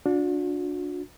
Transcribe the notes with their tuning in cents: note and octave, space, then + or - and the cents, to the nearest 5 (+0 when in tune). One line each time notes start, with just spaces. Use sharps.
D4 -10 F#4 -45